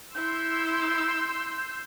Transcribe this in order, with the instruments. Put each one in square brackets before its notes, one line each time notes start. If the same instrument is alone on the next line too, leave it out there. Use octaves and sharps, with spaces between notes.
[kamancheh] E4 [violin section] C6 E6 [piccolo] G6